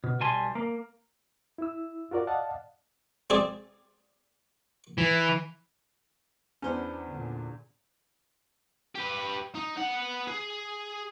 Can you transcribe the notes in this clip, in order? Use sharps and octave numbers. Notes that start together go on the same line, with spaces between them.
B2
B1 G3 G#5 A5 C6
A#3
E4 E6
F4 F#4 A#4 D5
D5 D#5 F5 F#5 A5
C4 G#4 D5
E3
E2 B3 C#4 D4 C5
A#2 D3
G4 B4
D#4
B3 F#5
G#4